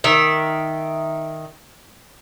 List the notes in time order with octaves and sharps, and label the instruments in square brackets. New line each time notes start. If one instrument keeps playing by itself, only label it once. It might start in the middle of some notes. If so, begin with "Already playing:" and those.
[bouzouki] D#3 E5